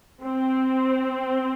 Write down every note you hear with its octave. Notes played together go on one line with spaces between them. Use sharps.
C4